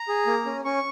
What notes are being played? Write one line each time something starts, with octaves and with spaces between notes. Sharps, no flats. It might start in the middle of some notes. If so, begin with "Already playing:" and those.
Already playing: A#5
G#4
A#3
C#4
C#4 C#6